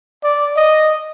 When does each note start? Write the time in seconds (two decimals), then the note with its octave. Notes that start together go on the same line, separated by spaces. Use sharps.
0.24 D5
0.57 D#5